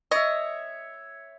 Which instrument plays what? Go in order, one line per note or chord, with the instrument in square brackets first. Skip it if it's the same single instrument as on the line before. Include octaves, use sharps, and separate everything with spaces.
[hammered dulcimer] C#5 E5 [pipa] D#5